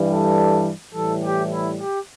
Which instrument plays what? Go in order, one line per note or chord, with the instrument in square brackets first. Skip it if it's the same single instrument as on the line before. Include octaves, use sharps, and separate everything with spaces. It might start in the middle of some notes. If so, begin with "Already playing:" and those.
Already playing: [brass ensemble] G2 E3 G3
A4
A2 E3 G3 A4
G4
E4
G4